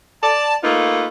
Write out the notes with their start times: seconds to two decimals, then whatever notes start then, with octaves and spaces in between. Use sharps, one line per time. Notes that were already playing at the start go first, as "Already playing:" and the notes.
0.23 D5 A5
0.63 A3 A#3 D#4 F4 B4